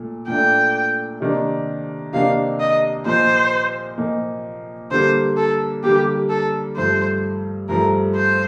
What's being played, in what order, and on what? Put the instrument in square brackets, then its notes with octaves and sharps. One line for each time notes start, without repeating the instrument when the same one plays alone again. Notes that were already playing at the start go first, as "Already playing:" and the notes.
Already playing: [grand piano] A#2 A3
[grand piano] A#2 A3 D4 [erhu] G5
[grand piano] C3 D#3 A#3 D4
[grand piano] C3 D#3 A#3 D4 [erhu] F5
[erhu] D#5
[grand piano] A#2 F3 A#3 D#4 [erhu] C5
[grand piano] A#2 F3 A#3 D#4
[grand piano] D3 G3 A#3 [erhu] C5
[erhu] A4
[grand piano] D3 G3 A#3 [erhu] G4
[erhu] A4
[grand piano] G2 F3 A3 [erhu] C5
[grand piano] G2 F3 A3 [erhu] A#4
[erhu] C5